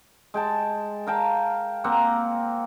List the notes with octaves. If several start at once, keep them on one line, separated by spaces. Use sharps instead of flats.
G#3 G5 A5
A#4 F5 G5 A5
A#3 C4 F#5 A#5